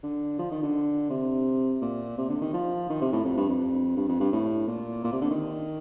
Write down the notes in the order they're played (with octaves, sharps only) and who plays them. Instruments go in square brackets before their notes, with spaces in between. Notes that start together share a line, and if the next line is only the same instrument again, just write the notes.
[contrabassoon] D3
F3
D#3
D3
C3
A#2
C3
D3
D#3
F3
D#3
C3
A2
F2
G2
F2
G2
F2
G2
A2
A#2
A#2
C3
D3
D#3